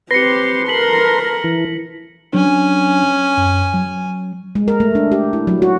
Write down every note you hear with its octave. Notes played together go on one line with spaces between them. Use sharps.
C4 G4 B4 C6 A#6 C#7
A4 A#4 B6 F#7
E3
F#3 C#4 D4 G#5
F#2
F#3
G#3
A#4
A3
D4
G4
E4
F#3
F#4